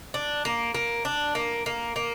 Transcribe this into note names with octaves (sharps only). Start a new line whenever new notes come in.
D4
A#3
A#3
D4
A#3
A#3
A#3